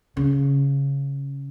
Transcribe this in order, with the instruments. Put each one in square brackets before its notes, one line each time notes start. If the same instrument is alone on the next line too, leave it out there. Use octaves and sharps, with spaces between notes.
[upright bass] C#3